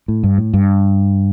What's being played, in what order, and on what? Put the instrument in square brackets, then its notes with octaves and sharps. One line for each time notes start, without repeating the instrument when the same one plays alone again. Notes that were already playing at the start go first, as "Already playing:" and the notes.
[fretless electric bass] A2
G2
A2
G2